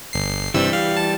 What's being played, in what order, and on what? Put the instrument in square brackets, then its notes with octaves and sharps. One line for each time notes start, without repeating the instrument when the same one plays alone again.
[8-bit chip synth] G1 C7
[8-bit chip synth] G2 C3 E6 [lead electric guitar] E3 G3
[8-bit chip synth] F5
A5